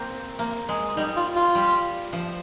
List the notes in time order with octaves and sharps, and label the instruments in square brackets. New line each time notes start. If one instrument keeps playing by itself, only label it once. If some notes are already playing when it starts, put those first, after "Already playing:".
Already playing: [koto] A#3 C4
A#3
G#3
[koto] G3 [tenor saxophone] D#4
[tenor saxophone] F4
F4
[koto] G3
F3